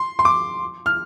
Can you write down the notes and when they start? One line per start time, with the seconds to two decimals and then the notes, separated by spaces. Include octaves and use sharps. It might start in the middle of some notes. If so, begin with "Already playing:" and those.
Already playing: C6
0.19 C6
0.25 D6
0.86 F6